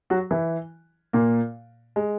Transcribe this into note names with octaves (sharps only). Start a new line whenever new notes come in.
F#3 F#4
E3 E4
A#2 A#3
G#3